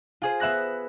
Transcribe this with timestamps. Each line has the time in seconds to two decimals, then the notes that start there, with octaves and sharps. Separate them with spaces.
0.22 F4 G#4 C5
0.40 B3 E5 B5 F#6 A#6